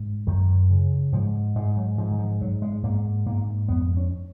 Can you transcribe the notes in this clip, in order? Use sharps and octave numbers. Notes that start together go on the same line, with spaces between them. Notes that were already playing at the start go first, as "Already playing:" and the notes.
Already playing: G#2
F#2 D#3
C#3
G#2 F3
G#2 G#3
F#3
G#2 F3
D#3
F3
G#2 F#3
G#3
G#2 A#3
G#2 A#3
F2 B3
C#4